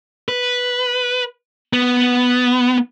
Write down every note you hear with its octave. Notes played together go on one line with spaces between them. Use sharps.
B4
B3